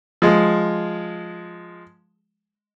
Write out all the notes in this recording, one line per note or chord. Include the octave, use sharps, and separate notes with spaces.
F3 G#3